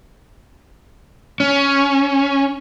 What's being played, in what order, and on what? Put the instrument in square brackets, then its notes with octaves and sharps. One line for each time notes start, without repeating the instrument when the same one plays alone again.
[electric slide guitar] C#4